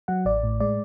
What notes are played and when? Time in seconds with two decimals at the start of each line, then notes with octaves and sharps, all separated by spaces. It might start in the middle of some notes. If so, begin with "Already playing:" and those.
0.08 F#3 F#5
0.25 A1 D5
0.43 A2
0.60 G#3 D5